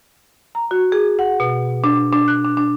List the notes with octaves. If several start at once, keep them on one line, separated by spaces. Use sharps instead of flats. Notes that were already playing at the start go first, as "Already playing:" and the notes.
A#5
F#4
G#4
F#5
B2
D4
D4
F#6
D4
D4